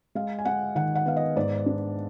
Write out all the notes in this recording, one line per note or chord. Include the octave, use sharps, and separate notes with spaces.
G#3 F5
G#5
G#3 F#5
D#3 F#5
F#5
B3 F5
D#5
G#2 D5
D4